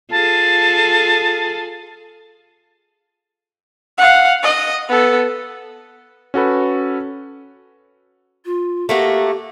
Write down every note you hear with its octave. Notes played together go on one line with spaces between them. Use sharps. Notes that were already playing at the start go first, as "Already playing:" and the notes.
F4 G#4 A4 A5
F5 F#5
D#5
B3 A4
C#4 F#4 A4 B4
F4
A3 A#3 F#4 G4